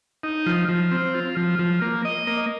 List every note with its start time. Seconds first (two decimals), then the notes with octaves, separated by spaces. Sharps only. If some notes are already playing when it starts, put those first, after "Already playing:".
0.23 D#4
0.46 F3
0.69 F3
0.92 C4
1.14 F4
1.37 F3
1.59 F3
1.81 A#3
2.05 D#5
2.27 A#3